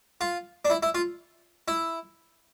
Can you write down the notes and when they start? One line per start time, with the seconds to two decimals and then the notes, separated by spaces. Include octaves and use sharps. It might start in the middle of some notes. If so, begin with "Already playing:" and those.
0.21 F4
0.65 D4
0.70 E4
0.83 E4
0.95 F4
1.68 E4